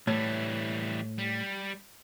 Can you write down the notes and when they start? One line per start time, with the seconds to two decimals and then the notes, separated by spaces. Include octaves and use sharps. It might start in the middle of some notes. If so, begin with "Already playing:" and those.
0.07 A2 E3 G3
1.18 G3